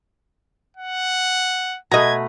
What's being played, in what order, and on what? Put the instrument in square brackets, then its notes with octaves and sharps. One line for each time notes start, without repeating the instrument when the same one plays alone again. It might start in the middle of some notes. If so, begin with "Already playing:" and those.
[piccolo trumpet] F#5
[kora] B2 A3 B4 [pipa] D#5 A#5 [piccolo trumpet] G#6